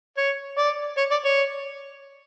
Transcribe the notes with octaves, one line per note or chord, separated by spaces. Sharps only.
C#5
D5
C#5
D5
C#5